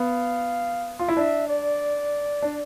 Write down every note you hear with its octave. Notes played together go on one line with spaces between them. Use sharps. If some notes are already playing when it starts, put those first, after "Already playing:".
Already playing: B3 F5
F4
E4
D4 E5
D5
D4